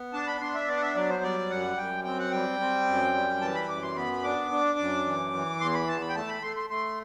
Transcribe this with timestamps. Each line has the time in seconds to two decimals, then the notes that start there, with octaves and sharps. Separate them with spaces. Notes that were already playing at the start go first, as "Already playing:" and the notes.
Already playing: B3
0.13 D4 A5
0.27 B5
0.41 D4 C6
0.55 E5
0.68 B3 D5
0.76 F#5
0.82 E5
0.95 F#3 D5
1.09 C5
1.23 G3 D5
1.50 F#2 F#5
1.77 F#2 G5
2.04 C4 G5
2.19 F#5
2.31 G3 G5
2.60 C4
2.87 F#2
3.15 G3
3.41 E3 A5
3.55 B5
3.69 F#2 D6
3.83 C6
3.96 B3 B5
4.24 D4 D6
4.51 D4
4.79 F#2
5.06 E3
5.33 E3
5.60 E2 C6
5.74 B5
5.88 E2 A5
6.01 B5
6.09 G5
6.15 A3 A5
6.29 B5
6.42 A3 C6
6.56 C6
6.70 A3 C6